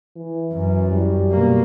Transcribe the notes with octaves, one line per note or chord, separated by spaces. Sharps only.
E3
F#2
G3
B2 A#3